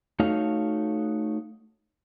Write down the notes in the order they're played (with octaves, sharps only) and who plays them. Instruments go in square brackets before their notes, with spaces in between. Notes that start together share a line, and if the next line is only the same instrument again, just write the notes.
[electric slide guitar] A3 D#4 F#4 A4 C#5 F5